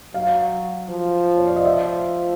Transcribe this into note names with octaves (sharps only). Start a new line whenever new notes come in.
F#3 F5
F3
C#5
D5
D#5
E5